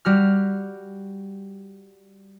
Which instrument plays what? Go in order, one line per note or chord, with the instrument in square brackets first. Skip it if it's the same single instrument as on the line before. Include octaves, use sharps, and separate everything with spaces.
[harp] G3 F#4 F6